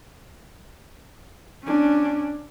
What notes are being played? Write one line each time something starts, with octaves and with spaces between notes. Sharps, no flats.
C#4 D4